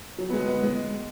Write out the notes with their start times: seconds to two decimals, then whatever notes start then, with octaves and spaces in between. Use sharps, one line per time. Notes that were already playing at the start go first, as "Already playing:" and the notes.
0.18 F#3
0.30 B3
0.33 G#3
0.47 B3
0.63 G#3